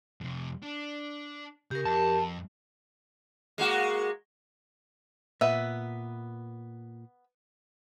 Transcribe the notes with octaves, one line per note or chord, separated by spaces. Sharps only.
F2 C3
D4
C#3 G4 A#4
F2 A5
G#3 A#3 F#4
A#2 B3 B4 E5